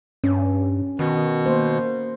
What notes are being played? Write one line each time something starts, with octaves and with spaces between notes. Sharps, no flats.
G2 C#4
B2 D#3
A#3 C5